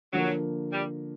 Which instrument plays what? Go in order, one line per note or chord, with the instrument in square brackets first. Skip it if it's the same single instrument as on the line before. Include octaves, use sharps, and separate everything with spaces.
[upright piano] D3 F3 A#3 [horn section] F#3
[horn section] G3